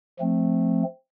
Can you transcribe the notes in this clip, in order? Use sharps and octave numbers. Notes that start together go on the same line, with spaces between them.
F3 A3 C4